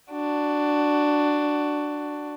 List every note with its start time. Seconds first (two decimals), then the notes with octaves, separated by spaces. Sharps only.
0.11 D4 F#4